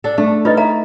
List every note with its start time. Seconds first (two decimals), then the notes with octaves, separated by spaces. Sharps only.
0.04 D4 A4
0.18 A3 D4
0.45 D#4 F4 B4 D#5
0.57 C#5 E5 A#5